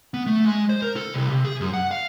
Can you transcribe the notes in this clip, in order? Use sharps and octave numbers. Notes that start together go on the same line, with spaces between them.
B3
A3
G#3
C5
A#4
A4
C2
C3
G#4
F#2
F#5
F5